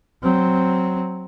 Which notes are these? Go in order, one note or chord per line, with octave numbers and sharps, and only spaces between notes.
F#3 C4